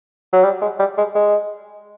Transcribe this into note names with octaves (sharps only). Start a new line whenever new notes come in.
F#3
G3
G#3
G3
G#3
G#3